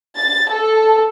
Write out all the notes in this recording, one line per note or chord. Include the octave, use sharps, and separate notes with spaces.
A6
A4